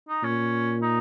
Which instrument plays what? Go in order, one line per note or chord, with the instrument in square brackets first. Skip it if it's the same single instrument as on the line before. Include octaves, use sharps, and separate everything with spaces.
[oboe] D#4
[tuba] A#2 [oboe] C#4
[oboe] D#4